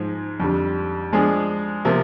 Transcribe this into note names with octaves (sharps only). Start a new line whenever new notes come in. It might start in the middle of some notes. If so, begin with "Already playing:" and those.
Already playing: G#2 F3 G#3
F2 D3 G3
F3 G#3 D4 G#4
C3 F3 A#3